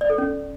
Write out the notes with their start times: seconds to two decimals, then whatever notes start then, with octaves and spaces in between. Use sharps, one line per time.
0.01 D5
0.10 A4
0.18 C#4